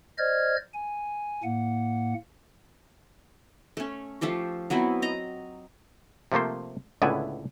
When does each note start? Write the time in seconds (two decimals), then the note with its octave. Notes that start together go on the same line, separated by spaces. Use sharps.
0.18 C5 D5 D#5 F6 G#6
0.73 G#5
1.44 A2 A#3 F#5
3.77 A3 C#4
4.21 F3 A3 F4 G4
4.70 F#3 B3 C4 E4
5.02 D#5 A#5
6.32 C3 F3 A3 A#3 C5
7.02 C#2 A2 D3 B3 E4 G#5